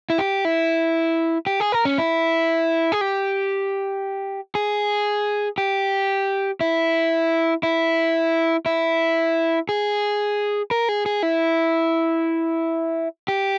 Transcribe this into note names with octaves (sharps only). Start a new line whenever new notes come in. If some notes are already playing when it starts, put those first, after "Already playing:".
E4
G4
E4
G4
G#4
A#4
C#4
E4
G#4
G4
G#4
G4
E4
E4
E4
G#4
A#4
G#4
G#4
E4
G4